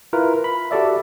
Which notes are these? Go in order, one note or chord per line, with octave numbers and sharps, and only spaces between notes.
E4 F4 A#4 B4
B5
F#4 G4 A4 D5 E5